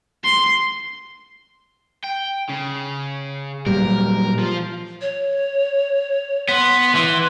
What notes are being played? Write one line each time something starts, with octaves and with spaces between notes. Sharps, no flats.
C6
G5
C#3
A#2 F#3 G3 A#4
F3 F4
C#5
B3 C6
E3 C6